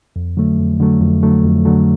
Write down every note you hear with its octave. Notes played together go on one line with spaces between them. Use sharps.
F2
D3 F#3 A3
F2
D3 F#3 A3
F2
D3 F#3 A3
F2
D3 F#3 A3